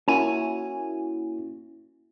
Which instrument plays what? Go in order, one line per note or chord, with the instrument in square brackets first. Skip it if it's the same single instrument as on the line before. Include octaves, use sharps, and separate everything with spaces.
[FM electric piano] A#3 E4 F#4 [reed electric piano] C#4 [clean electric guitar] G#5